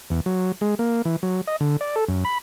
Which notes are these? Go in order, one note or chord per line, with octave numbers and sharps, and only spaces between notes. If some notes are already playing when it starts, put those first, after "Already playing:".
E2
F#3
G#3
A#3
E3
F#3
D#5
D3
D5
A4
F#2
B5